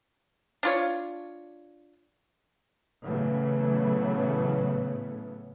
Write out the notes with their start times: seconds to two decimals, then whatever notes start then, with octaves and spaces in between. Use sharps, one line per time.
0.63 D4 F4 C#5
3.04 A2 C#3 E3 F#3 A3 B3